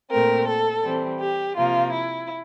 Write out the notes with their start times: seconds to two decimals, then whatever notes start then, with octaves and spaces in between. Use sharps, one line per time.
0.10 A#2 A3 C4 A#4
0.47 A4
0.83 E3 G3 C4
1.19 G4
1.56 C3 F3 A#3 F4
1.92 E4